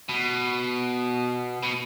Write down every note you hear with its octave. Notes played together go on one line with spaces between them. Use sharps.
B2
B2